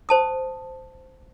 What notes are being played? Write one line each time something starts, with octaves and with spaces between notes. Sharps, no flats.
C5 A5 D#6